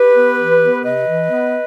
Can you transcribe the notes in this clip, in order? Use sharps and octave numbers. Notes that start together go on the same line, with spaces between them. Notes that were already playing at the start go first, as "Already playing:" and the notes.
Already playing: G4 B4
B3
E3
B3
C3 B4 D#5
E3
B3